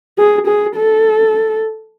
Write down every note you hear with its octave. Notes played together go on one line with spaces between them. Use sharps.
G#4
G#4
A4